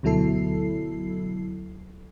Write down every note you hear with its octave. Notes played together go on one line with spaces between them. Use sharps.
D2 B2 F#3 E4 A4 C7